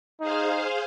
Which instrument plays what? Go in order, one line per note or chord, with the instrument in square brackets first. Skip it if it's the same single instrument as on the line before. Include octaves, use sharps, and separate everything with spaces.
[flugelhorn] D#4 [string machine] G#4 C5 F5